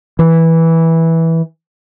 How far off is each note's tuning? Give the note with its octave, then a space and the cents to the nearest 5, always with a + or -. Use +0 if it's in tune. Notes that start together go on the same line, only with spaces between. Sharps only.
E3 -10